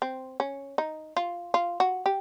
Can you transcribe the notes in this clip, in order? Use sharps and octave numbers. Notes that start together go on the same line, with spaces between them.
C4
C#4
D#4
F4
F4
F#4
G4